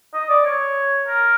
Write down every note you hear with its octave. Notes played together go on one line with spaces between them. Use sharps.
D#5
D5
C#5
A#4